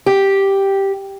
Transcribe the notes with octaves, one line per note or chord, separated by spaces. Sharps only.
G4